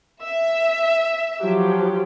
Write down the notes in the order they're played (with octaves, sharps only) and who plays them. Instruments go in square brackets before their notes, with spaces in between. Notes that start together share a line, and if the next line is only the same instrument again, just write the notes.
[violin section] E5
[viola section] F3 F#3 G4